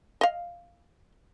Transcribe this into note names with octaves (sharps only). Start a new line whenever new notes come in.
D#5 F5